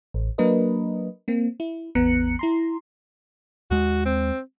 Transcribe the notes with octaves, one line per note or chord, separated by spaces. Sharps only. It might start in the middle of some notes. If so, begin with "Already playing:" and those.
A1
F#3 A#3 D4 A#4 B4 D#5
A#3 C4
E4
A1 E2 B3 A#5 F#6 C#7
E4 A#5 C6
D#2 G#3 F#4
C4